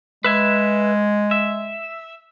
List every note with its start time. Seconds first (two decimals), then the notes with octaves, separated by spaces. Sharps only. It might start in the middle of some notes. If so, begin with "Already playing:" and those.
0.24 G#3 B4 E5 G#5
1.31 E5